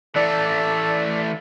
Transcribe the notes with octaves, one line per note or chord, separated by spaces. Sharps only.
E3 A3 A4 D5